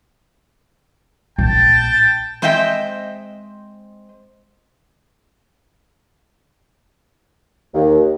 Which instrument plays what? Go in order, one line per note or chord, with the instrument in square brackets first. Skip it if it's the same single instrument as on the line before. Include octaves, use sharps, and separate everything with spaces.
[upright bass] A#1 [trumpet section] G5 A5
[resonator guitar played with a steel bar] G#3 C4 C5 D#5 E5 G5
[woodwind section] D#2